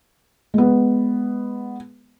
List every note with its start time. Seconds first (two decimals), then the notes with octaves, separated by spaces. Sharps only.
0.54 G#3 B3